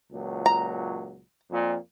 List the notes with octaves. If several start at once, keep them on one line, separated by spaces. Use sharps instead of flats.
C#2 A#2 F#3
A#5
F2 A#2